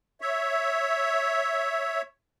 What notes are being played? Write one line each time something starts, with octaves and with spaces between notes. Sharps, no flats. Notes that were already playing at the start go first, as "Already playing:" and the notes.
C#5 E5